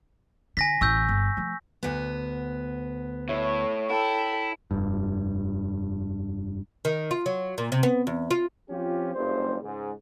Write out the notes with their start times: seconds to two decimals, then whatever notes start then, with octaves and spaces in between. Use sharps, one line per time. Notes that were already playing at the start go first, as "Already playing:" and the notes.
0.57 D3 G#5 A#6 B6
0.81 A1 E3 C#6 E6 G6
1.09 G1
1.37 F3 A3
1.83 D2 B3
3.29 A2 C#5 E5
3.90 E4 A4 G5
4.71 F1 G2
6.85 D#3
7.11 F4
7.26 F#3
7.58 A#2
7.72 C3
7.83 B3
8.07 E2
8.31 F4
8.70 F3 C4 C#4 F4 G4
9.14 F#1 G2 C5
9.63 C#2 G#2